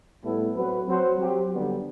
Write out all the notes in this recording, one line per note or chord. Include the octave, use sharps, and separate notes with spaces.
A2 G3 B3 E4 A4
F#3 C4 F#4 B4
F#3 C4 F#4 C5
F#3 C4 G4
D3 G3 B3